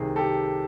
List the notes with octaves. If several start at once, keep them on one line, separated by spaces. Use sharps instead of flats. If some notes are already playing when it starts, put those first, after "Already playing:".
Already playing: C2 C3 D#3 G#4
G4 A4